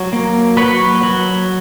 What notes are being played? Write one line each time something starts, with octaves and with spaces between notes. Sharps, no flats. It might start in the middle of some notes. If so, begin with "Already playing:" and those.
Already playing: F#3
A#3
F#3 B4 C#5
F#3